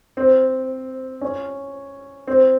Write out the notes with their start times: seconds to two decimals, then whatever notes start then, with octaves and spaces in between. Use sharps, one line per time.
0.17 C4
1.21 C#4
2.27 C4